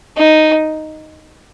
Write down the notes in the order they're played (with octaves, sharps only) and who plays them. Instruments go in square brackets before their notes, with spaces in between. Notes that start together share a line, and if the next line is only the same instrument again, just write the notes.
[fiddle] D#4